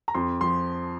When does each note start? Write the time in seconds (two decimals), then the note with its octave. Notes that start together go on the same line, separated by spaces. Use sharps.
0.08 A#5
0.14 F2 C6
0.41 F3 C6